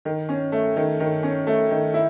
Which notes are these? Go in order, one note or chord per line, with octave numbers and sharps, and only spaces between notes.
D#3
C#4
A3
D#3
D#3
C#4
A3
D#3
E4